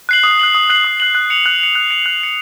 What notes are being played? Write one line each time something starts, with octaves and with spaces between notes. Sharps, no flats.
F#6 C7 F#7
D#6
F#6 C7 F#7
D#6
F#6 C7 F#7
D#6
F#6 C7 F#7
F#6
C#7 F7
F#6
C#7 F7
F#6
C#7 F7
F#6
C#7 F7